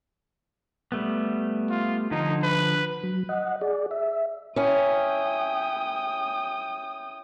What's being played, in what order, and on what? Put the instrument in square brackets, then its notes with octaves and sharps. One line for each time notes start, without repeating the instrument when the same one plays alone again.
[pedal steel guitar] G3 A3 B3
[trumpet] F4
[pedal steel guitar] D3 F3 [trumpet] D#4
[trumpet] B4
[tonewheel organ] F#3
D#5 F#5
G#4 D5
E5
[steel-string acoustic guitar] C#4 E4 [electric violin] G5 D#6